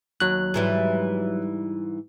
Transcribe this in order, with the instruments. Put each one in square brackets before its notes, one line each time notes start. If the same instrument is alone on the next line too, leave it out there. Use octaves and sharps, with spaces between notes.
[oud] D#2 [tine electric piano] F#3 F#6
[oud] G#2 E3 G3